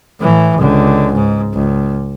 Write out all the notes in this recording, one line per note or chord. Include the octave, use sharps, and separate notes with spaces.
A2 E3
C#2 D3
G#2
C#2